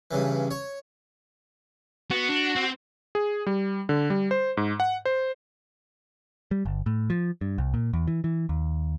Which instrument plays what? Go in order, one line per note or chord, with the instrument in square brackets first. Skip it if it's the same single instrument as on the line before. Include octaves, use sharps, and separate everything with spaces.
[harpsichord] G2 C#3 E3
C#5
[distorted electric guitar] B3 [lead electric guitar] F#4
[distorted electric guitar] D4
C4
[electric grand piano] G#4
G3
D3
G3
C5
G#2
F#5
C5
[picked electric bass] G3
G1
A2
F3
G2
C2
A#2
E2
E3
E3
D#2